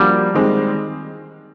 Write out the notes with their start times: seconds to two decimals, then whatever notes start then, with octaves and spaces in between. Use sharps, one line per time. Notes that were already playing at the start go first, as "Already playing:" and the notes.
Already playing: F3 G3 A#3 D4 F#4
0.34 D#3 G#3 C4 D#4